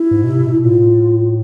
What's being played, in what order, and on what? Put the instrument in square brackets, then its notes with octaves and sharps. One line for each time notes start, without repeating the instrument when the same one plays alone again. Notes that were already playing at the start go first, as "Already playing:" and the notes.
Already playing: [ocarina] E4
[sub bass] G#2
B2
C3
B2
[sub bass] A2 [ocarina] F4